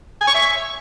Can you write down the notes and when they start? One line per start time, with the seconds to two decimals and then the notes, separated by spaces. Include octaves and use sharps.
0.21 G#5
0.27 C#6
0.34 E5